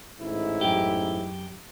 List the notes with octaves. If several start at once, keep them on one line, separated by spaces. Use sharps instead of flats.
A1 G#2 E4
F#2 G4